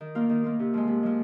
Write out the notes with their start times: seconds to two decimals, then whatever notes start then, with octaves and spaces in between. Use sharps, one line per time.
0.01 D#3
0.15 A#3 F4
0.29 D#3
0.44 A#3 F4
0.59 C3
0.74 F3 G#3
0.88 C3
1.03 F3 G#3